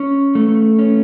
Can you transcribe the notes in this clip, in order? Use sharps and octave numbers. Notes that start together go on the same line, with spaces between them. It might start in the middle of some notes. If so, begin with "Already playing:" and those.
Already playing: C#4
A3
C#4